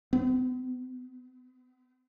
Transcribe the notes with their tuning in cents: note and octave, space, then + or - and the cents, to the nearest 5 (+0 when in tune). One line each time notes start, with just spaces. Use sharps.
B3 +45